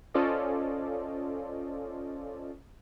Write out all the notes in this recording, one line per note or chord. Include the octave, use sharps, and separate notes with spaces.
C#4 F4 A4 C5 D5 D#5